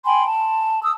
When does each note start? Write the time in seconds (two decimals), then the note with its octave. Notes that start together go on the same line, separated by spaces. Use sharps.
0.05 G5 G#5 B5 C6
0.27 A5
0.83 D#6 E6